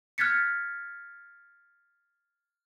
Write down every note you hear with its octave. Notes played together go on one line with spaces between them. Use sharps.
F6 F#6 G#6 A6 B6 C#7